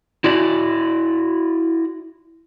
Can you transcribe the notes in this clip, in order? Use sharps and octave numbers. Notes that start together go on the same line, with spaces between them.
E4 F#4 D5